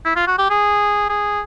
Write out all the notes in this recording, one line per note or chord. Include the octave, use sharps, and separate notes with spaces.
E4
F4
F#4
G4
G#4
G#4